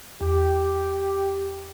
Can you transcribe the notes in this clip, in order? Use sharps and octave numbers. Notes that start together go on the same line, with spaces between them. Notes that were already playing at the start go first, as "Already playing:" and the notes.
E2 G4